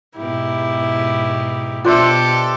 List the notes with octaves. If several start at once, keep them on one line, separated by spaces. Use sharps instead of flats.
G#2 B2 E4 G4
B2 D4 F4 G4 A4 C5 E5